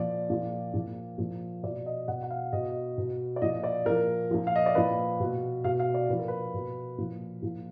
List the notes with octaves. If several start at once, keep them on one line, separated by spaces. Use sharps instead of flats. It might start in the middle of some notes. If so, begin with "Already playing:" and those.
Already playing: A#2 F3 D5
A#2 F3
A#2 F3
A#2 F3
B2 D5
D#5
B2 F#5
F#5
F5
B2 D#5
B2
D5
A#2 F3 D#5
D5
A#2 F3 A#4
A#2 F3
F5
D#5
D5
A#2 F3 B4
B2
B2 F5
F5
D5
A#2 F3 B4
A#4
B4
B2
A#2 F3
A#2 F3